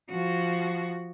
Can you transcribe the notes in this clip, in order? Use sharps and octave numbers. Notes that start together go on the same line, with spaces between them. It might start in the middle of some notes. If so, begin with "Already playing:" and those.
F3 F#4